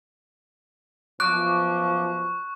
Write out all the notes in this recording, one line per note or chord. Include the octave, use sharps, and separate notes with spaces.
F#2 B2 F3 C#6 D6 F#6